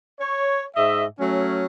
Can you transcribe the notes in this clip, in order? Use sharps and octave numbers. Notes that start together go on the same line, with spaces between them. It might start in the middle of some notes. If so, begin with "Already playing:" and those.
C#5
G#2 D#5 E5
F#3 A3 C#4